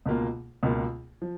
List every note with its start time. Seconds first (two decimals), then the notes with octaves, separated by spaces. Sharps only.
0.06 C#2 B2 A#3 F4
0.63 C#2 B2 A#3 F4
1.22 F3